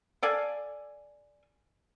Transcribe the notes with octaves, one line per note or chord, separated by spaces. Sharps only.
A4 D5 F5 G#5